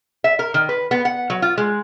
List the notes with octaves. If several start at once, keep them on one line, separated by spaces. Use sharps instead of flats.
E5
A#4
D#3
B4
B3
F#5
F#3
F4
G#3